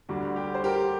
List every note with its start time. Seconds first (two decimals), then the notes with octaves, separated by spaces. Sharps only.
0.09 D2 D3 G3 F#4
0.36 G4
0.55 C5
0.64 G4 A#4